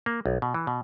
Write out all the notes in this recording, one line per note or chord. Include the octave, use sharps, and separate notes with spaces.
A#3
B1
B2
E3
B2